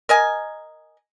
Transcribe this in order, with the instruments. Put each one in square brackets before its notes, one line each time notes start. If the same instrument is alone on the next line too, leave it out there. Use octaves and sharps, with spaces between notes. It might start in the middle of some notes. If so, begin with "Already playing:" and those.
[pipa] A#4 D#5 G#5